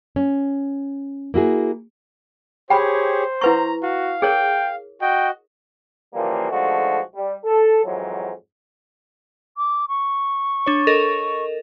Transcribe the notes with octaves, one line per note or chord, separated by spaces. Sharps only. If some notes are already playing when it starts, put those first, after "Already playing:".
C#4
A#3 E4 F#4 G#4
G4 G#4 C5 C#5 G5 B5
E4 B4 A#5 C#6
F#4 F5
G#4 A#4 C#5 G5
F#4 D#5 G5
C#3 E3 F3 G3 A#3
B1 F3 G#3 A3 D4 F#4
G3
A4
F2 G#2 E3 F#3
D6
C#6
D4 C#5
A4 A#4 D#5